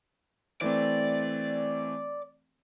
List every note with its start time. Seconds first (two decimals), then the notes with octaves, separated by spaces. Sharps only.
0.62 E3 A3 C4 D5